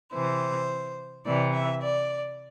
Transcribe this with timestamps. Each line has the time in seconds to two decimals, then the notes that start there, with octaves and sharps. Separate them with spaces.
0.14 C3 E3 C5
1.26 C3 E3 D5
1.54 E5
1.82 D5